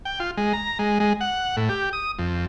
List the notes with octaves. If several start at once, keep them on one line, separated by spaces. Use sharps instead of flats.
G5
F4
G#3
A#5
G#3
G#3
F#5
A2
G4
D#6
F2